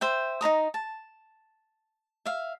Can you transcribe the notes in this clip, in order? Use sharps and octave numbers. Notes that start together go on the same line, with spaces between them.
C5 E5 G5
D#4 C5 A#5 D#6
A5
E5 F5